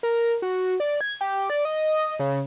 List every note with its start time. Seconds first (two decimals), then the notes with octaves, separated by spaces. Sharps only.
0.03 A#4
0.42 F#4
0.80 D5
1.01 G#6
1.21 G4
1.50 D5
1.65 D#5
2.19 C#3